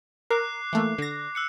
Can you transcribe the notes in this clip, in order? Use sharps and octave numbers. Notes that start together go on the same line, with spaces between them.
A#4 D6 F#6 C7
E3 A3 A#3
D3 A#6
E6 F#6 C#7